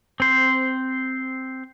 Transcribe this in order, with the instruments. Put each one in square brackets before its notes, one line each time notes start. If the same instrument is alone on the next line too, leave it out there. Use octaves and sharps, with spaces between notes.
[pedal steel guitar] C4 C5